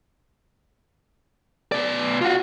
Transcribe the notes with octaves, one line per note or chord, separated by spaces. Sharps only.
B2 D5
F4 F#4